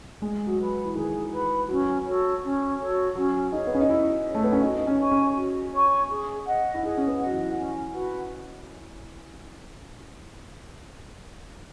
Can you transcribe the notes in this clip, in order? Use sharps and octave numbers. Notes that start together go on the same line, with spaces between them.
G#3 G#4
F#3
B4 F#5 B5
E3
D#3 G#4
B4 F#5 B5
F#3 C#4
F#4 A4 C#5
C#4
F#4 A4 C#5
F#3 C#4
D#4 G#4 C#5
B3
C#4
D#4
C#4 E4
G#4 C#5
A3
B3
C#4
D#4 F#4
D#4
C#4
C#5 G#5 C#6
C#4
F#4
C#5 G#5 C#6
G#4
D#5 F#5
E4
D#4 G#4
C#4
B3
D#5 F#5
F#3
E3
C#4
F#4 B4 F#5